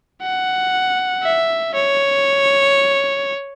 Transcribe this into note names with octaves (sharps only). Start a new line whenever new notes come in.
F#5
E5
C#5